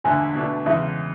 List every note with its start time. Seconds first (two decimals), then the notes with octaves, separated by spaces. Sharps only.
0.04 E1 D2 D3 G#5
0.35 B2 A3 D4
0.66 E2 C#3 G#3 E5